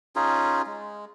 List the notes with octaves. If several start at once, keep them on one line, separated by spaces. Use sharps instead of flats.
C#4 D#4 F4 G#4
G#3